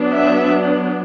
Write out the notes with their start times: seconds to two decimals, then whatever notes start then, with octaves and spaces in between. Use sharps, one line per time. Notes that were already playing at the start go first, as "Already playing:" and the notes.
Already playing: F#3 B3 D4
0.15 E5